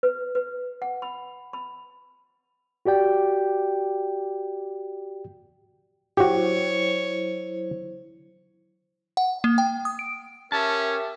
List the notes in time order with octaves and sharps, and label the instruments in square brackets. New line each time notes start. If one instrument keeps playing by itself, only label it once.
[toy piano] B4
B4
F#5
B5
B5
[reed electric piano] F#4 G4 D5 G5
[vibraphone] F#3 E4 C5 [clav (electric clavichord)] F#4 G4 [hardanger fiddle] C#5
[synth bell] F#5
A#3
G5
D#6
D7
[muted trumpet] C#4 [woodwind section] G4 E5 [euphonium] A#4 [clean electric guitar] A5